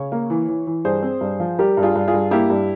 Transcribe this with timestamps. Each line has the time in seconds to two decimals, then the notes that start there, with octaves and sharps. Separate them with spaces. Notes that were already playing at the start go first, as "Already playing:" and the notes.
Already playing: C#3 C#5
0.12 A#3
0.30 E3
0.49 E3
0.67 E3
0.85 G2 G#4 C5
1.03 C4
1.21 G2
1.40 F3
1.59 G3 G4 A#4
1.77 G2
1.83 F4 G#4
1.96 G2
2.08 F4 G#4
2.14 G2
2.31 A#3 E4 G4
2.50 G2